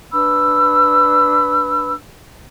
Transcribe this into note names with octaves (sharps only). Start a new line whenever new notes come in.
D4 B4 B5 E6